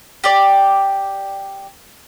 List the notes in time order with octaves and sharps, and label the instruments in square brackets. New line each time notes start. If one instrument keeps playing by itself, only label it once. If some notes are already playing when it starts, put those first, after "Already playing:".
[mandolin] G4 D5